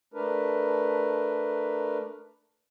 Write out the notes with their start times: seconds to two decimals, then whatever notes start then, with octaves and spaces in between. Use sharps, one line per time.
0.14 A3 D4 A#4 B4